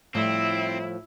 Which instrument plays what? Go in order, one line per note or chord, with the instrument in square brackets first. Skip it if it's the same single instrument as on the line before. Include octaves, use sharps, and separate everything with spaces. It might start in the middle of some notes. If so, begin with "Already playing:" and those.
[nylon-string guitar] A2 F3 G3 [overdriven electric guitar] C4 [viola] E4